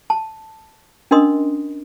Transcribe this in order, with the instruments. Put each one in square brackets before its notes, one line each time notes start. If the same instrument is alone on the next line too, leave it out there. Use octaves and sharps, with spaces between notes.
[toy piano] A5
C#4 D4 A#4 D#5 C6 D#6